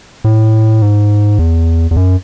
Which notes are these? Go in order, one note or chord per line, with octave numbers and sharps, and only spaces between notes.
A2
G#2
E2
E2
F#2